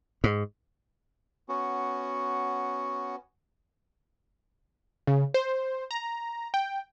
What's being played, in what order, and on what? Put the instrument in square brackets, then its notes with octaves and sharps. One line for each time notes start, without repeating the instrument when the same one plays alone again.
[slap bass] G#2
[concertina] B3 C#4 F#4
[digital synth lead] C#3
C5
A#5
G5